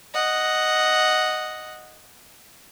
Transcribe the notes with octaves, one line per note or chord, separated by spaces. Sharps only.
D#5 F#5